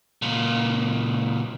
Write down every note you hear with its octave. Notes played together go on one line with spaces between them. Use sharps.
C#2 A#2